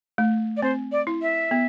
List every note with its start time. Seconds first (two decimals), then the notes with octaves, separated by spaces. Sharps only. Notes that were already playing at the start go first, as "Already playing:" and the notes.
0.18 A3
0.57 D5
0.62 C4 C5
0.92 D5
1.07 E4
1.22 E5
1.51 B3